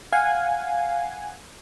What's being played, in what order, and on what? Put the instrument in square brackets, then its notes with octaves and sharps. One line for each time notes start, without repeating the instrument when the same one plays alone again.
[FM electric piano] F5 [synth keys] F#5 G#5